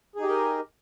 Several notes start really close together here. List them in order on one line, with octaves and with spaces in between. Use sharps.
G#4 D#4 G4 D#5 A#4